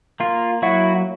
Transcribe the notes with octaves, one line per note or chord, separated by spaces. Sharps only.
A#3 F4
F#3 E4 F#4